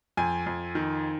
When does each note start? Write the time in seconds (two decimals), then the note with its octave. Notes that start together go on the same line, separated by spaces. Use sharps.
0.17 F2 G#5
0.46 F2
0.75 D#3